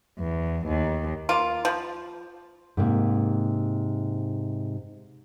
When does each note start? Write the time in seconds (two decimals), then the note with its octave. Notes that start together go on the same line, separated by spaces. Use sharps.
0.19 E2
0.67 D#2
1.29 A#3 F4
1.65 F3
2.77 G#2 C3 A#3